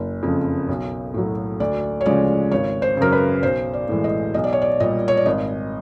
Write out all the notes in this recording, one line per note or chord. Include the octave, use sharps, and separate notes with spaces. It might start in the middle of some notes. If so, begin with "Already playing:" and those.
Already playing: F#1
F2 C#3
B1
A2 F#3
D2 D5
C#5
C#3 F3 G#3 D5
G#1 C#5
C5
F#2 C#3 A#4
B4
B1 C5
D5
A2 E3 G#3
D#5
B1 D#5
D5
C#5
D5
A#2 G3 D#5
C#5
D5
G#1 D#5